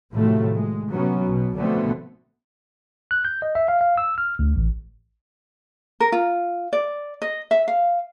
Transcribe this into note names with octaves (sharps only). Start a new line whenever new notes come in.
A2 C3 D#3 F3 F#3 A3
G#3
C3 F#3 B3 C#4
B1 B2
B2 D3 F3 A3 B3 C4
F#6
G6
D#5
E5
F5
F5
E6
F6
D2
A1
A#4
F4
D5
D#5
E5
F5